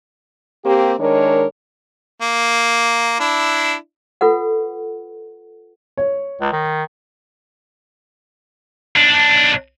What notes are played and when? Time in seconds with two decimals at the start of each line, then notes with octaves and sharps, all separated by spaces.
0.64 A#3 C4 G4
1.00 D#3 G#3 D4 A#4 C#5
2.22 A#3
3.20 D4 E4
4.21 F4 A4 B4 F#5
5.97 C#5
6.41 C#2
6.53 D#3
8.97 B1 D4